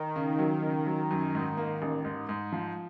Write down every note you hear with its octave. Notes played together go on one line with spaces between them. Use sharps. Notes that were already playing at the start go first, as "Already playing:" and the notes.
Already playing: D#3
C#3
F#3
C#3
F#3
F#2
G#2
A#3
A1
G#2
G#2
F3